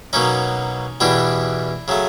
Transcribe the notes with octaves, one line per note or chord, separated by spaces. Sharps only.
B2 F#3 A#3 C#4 D#4
E2 B2 G3 D4 E4
C#3 F#3 A3